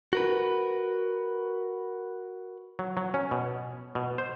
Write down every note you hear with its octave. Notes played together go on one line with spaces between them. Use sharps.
F#4 A#4 B4
F#3
F#3
C#4
B2
B2
C5